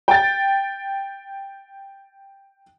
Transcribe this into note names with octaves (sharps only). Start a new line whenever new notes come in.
G5 A6